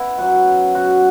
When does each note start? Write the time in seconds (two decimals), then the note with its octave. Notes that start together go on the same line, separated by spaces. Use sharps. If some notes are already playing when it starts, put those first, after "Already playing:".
Already playing: B3 E4
0.18 F#2 F#3 F#4
0.75 F#4